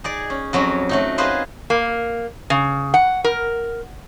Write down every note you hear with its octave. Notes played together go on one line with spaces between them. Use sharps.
D#4 G#4 D5
C#4
F2 F#3 C#4 A#5 B5
F#3 A3 D#4
D#4 F4 G#4 B4 C5
A#3
C#3
F#5
A#4